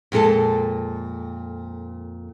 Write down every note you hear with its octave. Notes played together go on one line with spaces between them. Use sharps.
F2 A#2 G#3 A4 A5